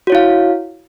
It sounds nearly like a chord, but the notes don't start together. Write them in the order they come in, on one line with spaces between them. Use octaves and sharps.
F#4 C#5 E4 F5